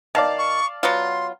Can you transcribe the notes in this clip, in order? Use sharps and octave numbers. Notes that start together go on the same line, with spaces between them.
D#3 D5 F5 A5
C#6
F#3 B3 F4 C6